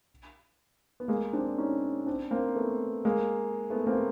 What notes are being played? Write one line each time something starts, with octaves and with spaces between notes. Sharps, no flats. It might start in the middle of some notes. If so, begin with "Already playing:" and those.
B3
G#3 A#3
C4 D4
C#4 D#4
C4 D4
A#3 C4
A3 B3
G#3 A#3
A3 B3
A#3 C4